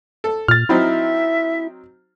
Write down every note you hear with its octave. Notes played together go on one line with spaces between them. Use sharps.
A4
A#2 F6 A6
F#3 C4 D#4 E4 E5